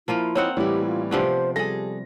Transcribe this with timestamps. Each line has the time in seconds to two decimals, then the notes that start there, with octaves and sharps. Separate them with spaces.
0.08 F3 A#3 E4 F4
0.35 A#3 C4 D#4 C#5 F#5
0.57 A2 E3 G3 E4 G4 C#5
0.86 F4
1.11 C3 F3 A3 B3 D4 G4 C5
1.56 G3 G#4 A4 A#6